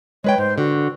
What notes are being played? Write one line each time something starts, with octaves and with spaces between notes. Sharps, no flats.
G#3 B4 C#5 G5
G#2 C5
D3 F#4